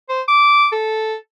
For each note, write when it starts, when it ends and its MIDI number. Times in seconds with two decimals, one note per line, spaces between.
0.09 0.21 72
0.28 0.67 86
0.72 1.15 69